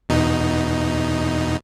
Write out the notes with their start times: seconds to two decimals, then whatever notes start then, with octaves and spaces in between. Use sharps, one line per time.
0.09 E2 B2 D#4